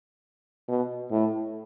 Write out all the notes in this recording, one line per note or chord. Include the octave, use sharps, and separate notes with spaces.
B2
A2